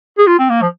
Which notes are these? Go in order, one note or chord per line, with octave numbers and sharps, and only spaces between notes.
G#4
F4
C4
A#3
F3